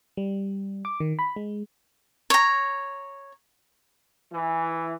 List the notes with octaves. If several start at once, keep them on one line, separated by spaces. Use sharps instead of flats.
G3
D6
D#3
B5
G#3
C#5 A#5
E3